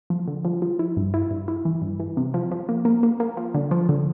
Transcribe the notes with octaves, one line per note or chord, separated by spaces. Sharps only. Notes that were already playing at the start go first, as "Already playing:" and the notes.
F3
D3
F3
F3
E4
G2
E4
G2
E4
E3
G2
E3
C3
F3
F3
A#3
A#3
A#3
A#3
F3
D3
F3
D3